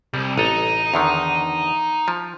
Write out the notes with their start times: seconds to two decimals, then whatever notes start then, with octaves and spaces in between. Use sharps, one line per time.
0.14 C2 G3
0.38 A1 D#4 A4
0.94 E2 D3 D#3
2.08 F3